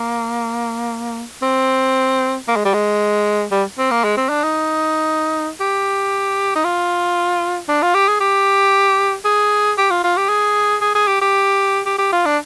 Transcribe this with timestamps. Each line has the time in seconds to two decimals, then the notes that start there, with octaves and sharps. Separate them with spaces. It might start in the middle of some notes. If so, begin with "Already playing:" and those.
Already playing: A#3
1.42 C4
2.48 A#3
2.56 G#3
2.65 G3
2.74 G#3
3.52 G3
3.78 C4
3.91 A#3
4.04 G#3
4.17 C4
4.29 D4
4.43 D#4
5.60 G4
6.56 D#4
6.64 F4
7.68 D4
7.82 F4
7.94 G4
8.08 G#4
8.20 G4
9.25 G#4
9.78 G4
9.90 F4
10.04 F4
10.17 G4
10.29 G#4
10.81 G#4
10.95 G#4
11.07 G4
11.21 G4
11.86 G4
11.98 G4
12.12 F4
12.26 D4